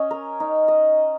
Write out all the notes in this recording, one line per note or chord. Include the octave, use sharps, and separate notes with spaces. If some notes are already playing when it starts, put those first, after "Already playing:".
Already playing: C#4 D#5
A#4
D#4
D#5